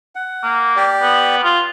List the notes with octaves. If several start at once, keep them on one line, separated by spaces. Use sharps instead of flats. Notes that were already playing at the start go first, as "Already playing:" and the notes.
F#5
A#3
G4 D5
B3
F4